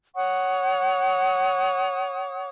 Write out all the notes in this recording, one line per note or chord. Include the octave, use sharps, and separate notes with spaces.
C#5 F#5 C#6 D#6